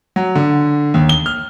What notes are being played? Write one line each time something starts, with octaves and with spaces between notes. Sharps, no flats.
F#3
D3
D#2
G7
F6